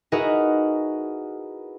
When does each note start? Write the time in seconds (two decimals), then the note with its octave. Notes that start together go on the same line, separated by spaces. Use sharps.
0.12 D#4 E4 F#4 G#4 A#4 B4